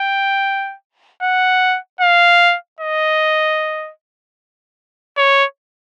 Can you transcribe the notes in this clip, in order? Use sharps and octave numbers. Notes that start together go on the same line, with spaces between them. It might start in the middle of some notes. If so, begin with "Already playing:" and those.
Already playing: G5
F#5
F5
D#5
C#5